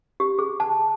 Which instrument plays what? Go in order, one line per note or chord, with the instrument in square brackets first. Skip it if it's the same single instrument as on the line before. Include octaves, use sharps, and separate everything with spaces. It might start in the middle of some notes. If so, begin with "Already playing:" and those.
[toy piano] G4
G#4
A5